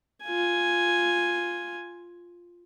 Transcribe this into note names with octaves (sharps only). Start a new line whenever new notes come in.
F4 G#5